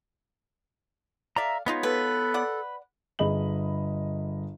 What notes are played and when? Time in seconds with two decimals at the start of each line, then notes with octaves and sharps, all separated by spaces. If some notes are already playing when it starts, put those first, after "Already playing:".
1.36 A4 D5 E5 F5 A#5
1.66 G#3 B3 D#4 F4 C#5
1.83 A4 B4
2.34 D5 F#5
3.19 G1 G#4 D#5 B5 F#7